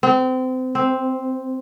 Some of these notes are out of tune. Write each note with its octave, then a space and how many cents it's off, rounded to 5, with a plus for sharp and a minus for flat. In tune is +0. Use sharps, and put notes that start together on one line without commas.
C4 -30
C4 +0